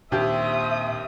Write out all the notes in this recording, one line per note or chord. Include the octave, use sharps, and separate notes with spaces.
D#2 A#2 C4 D4 G4 E5 D#6